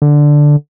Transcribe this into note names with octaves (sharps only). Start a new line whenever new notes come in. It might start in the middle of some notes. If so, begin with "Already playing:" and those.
D3